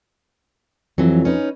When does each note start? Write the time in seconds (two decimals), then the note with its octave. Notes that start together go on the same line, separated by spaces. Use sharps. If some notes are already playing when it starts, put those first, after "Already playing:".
0.98 F2 E3 F#3
1.25 C#4 D#4 B4